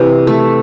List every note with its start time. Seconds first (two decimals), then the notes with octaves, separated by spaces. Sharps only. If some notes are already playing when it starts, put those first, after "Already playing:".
Already playing: C3 E3
0.27 A3